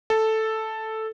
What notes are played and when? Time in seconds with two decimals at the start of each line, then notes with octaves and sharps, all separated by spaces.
0.10 A4